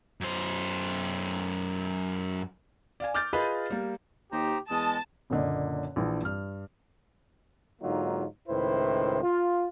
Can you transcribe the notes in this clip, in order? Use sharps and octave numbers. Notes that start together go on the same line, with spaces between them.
F#2 C5
D5 F5 G#5
D6 F6 G6 A6
F4 G#4 B4 D#5 B5
G3 A#3
D#2 D#4 G4 C5 A#5
E2 G#3 A5 D#6
F#1 A#2 D3 D#5
A#1 E3 D4
G2 F6
G#2 D3 F#3 A#3 D#4 F4
C#2 A2 D#3 E4 B4 C5
F4